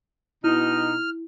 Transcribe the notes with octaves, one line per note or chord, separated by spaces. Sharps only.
B2 D#4 E4 F6